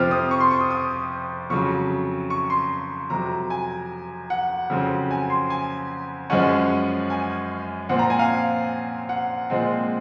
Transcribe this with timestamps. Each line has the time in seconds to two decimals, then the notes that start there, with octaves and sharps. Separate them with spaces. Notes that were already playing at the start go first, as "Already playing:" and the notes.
Already playing: F2 C3 F3 C4 F6
0.11 D#6
0.31 C#6
0.40 C6
0.51 C#6
0.60 D#6
0.71 D#6
1.50 F2 C#3 F#3 C#6
2.30 C#6
2.50 C6
3.10 F2 C3 F#3 A#5
3.50 G#5
4.30 F#5
4.70 F2 C#3 F#3 C4
5.11 G#5
5.30 C6
5.50 G#5
6.30 F#2 F3 G#3 C#4 F#5
7.10 G#5
7.89 A#2 F3 C4 F#5
7.99 A#5
8.10 G#5
8.19 F5
9.09 F#5
9.50 A#2 F3 G#3 C4